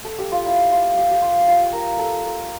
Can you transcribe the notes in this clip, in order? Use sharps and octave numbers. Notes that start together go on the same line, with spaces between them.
A4
G4
F4
E4
F4
G4
G4
F4
F4
A#4
A4
A#4